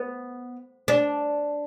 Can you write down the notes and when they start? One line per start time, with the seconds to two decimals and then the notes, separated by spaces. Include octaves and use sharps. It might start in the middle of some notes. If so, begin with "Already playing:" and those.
Already playing: B3
0.88 D4